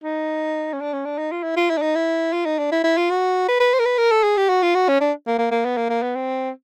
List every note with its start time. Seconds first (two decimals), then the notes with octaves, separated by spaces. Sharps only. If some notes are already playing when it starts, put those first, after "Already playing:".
0.04 D#4
0.73 C#4
0.80 D4
0.93 C#4
1.05 D4
1.18 D#4
1.32 F4
1.43 E4
1.56 F4
1.70 E4
1.77 D4
1.82 D#4
1.95 E4
2.33 F4
2.45 D#4
2.59 D4
2.72 E4
2.84 E4
2.97 F4
3.10 F#4
3.48 B4
3.60 B4
3.74 C5
3.80 A#4
3.86 B4
3.98 A#4
4.11 A4
4.24 G#4
4.37 G4
4.49 F#4
4.63 F4
4.75 F#4
4.88 C#4
5.01 D4
5.27 A#3
5.39 A#3
5.51 A#3
5.65 B3
5.77 A#3
5.90 A#3
6.02 B3
6.15 C4